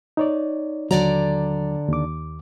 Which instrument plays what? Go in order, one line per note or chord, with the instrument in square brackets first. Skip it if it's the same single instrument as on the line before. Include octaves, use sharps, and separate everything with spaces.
[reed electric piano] D#4 C#5 D5
[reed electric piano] D#2 F#3 [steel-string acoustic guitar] D3 D5 A#5
[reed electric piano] D#2 D6